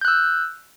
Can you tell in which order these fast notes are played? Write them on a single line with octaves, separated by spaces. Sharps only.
G6 F#6 E6